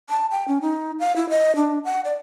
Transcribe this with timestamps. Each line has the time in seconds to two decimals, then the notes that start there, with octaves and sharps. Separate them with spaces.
0.10 A5
0.31 G5
0.48 C#4
0.61 D#4
1.00 F5
1.16 E4
1.30 D#5
1.56 D4
1.85 F#5
2.05 D5